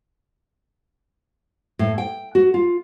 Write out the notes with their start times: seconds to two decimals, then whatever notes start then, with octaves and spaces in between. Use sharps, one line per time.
1.79 A2
1.98 G5
2.35 F#4
2.54 F4